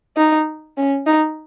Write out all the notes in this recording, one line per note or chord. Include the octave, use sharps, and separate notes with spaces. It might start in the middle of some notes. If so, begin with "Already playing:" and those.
D#4
C#4
D#4